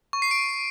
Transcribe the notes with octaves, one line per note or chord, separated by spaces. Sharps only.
C#6
C7
D7